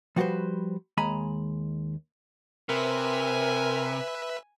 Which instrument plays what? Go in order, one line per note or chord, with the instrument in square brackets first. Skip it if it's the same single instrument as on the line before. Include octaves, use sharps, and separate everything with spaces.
[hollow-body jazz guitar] F3 G3 F#4 G#4 B4 C5
D#2 G#3 G#5 A#5 B5
[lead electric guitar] C3 [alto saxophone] A#4 [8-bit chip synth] B4 E5 [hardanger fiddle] G#5